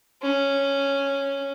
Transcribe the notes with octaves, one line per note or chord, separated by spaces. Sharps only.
C#4